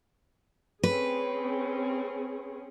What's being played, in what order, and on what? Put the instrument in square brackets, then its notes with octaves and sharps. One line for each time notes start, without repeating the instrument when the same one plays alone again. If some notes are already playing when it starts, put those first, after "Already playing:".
[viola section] C4 C#4 G#4 [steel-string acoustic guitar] B4